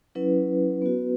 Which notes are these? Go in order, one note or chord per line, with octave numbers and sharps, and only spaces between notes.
F#3 C#4 E4 B4
B3 F#4